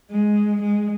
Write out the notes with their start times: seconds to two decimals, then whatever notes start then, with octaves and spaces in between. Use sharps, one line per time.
0.11 G#3
0.62 G#3